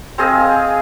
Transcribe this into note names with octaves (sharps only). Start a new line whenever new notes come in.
C4 G#4 D#5 F5